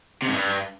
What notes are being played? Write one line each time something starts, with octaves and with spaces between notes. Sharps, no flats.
C3
G#2
G2